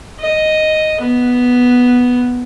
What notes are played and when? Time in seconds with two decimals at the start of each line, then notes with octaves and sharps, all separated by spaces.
0.20 D#5
1.01 B3